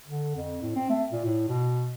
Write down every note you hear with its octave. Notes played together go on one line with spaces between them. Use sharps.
D3
F2
A2
C4
A3
A#2
A2
B2